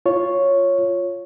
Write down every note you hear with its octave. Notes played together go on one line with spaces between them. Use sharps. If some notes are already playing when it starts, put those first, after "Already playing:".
F4 C#5